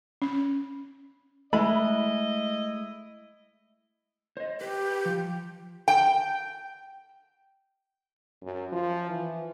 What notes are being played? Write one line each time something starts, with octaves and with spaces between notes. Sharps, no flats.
C#4
G#3 A3 E4 D#5 B5
C5 D#5
G4 B4
F3
G5
F#2
F3
E3